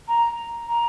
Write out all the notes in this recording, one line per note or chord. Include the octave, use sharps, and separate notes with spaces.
A#5
A#5